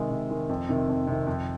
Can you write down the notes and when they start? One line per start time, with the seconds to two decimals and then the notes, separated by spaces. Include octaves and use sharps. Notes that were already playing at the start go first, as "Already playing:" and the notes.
Already playing: C3 D#3 G#3
0.10 C3
0.30 D#3 G#3
0.49 F2
0.69 C3 D#3
0.89 F2
1.07 C3 D#3
1.27 F2